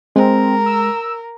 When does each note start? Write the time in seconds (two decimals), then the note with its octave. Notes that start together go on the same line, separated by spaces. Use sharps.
0.16 G#3 C4 A#4
0.66 E6